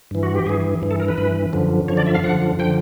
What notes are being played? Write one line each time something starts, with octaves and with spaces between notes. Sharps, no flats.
G2 E3
F#4
G4
G2 E3 G#4
G2 E3
A4
A#4
B4
G2 E3
F#2 D3 F3
F#2 D3 F3 C#5
D5
E5
F5
F#2 D3 F3 F#5
D3 F3 G5